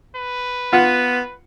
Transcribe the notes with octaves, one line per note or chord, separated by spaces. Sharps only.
B4
B3 F4 F#5